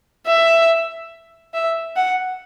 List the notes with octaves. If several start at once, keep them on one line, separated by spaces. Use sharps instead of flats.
E5
E5
F#5